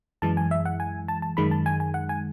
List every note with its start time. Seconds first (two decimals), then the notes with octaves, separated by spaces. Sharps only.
0.22 F#2 E3 G#3 A5
0.37 G#5
0.51 E5
0.65 F#5
0.80 G#5
1.08 A5
1.22 A5
1.37 F#2 D#3 G#3 B5
1.51 A5
1.66 G#5
1.80 G#5
1.94 F#5
2.09 G#5